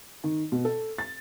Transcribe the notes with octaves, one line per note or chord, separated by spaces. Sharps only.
D#3
B2
A4
A6